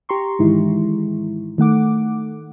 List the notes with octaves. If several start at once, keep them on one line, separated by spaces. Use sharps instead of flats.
G4 A#5 C6 C#6
G#2 D#3 E3 G#3 E4
D#3 A3 F#5 D6